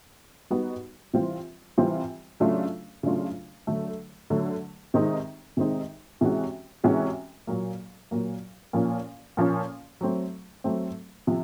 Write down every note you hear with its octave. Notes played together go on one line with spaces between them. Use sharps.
G3 B3 D#4 F#4
C3 E3 G3 C4 F4
C3 E3 G3 C4 F4
C#3 F#3 A3 D4 F4
C#3 F#3 A3 D4 F4
D3 F#3 A3
D3 F#3 A3
C3 D#3 G#3 C4 D#4
C3 D#3 G#3 C4 D#4
C3 E3 G#3 C#4 F#4
C3 E3 G#3 C#4 F#4
A#2 F#3 A#3
A#2 F#3 A#3
A#2 F3 A#3 C#4
A#2 F3 A#3 C#4
F#3 A3 C4
F#3 A3 C4
C3 F3